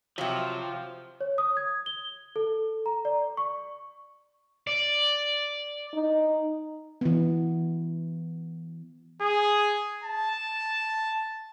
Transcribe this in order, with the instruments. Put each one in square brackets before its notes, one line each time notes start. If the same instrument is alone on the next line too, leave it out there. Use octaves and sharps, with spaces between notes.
[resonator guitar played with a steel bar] C3 F#3 [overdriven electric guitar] F3
[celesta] C#5
D#6
G#6
G7
A4
A#5
D5
C#6
[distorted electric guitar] D5
[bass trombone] D#4
[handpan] E3 B3
[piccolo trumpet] G#4
A5